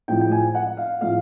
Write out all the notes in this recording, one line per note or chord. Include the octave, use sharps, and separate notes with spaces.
A2 F3 G#3 G5
G5
G#5
F#5
F5
A2 F3 G#3 F5